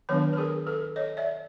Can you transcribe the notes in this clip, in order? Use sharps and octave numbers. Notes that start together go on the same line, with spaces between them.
D#3 F#3 B3 D4 B4 C#5
B4
G#4 A#4
A4 B4
C#5 D#5
D5 E5